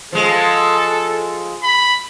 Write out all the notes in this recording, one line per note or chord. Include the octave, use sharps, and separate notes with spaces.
F3 G#3 A4
B5